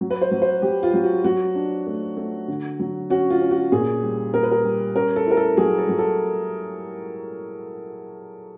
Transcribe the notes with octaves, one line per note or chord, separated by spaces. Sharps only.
F#3
B4
C5
F#3
C5
F#3 G4
F4
F#3
F#4
F#3 F#4
D4
A3
A3
D3
F#3
C#4 F#4
F4
C#4
F#4
A#2 G#4
G3
A#2 A#4
B4
A#4
G3
C#4 A#4
A4
E4 A#4
A4
F#3 G#4
A4
F#3
A4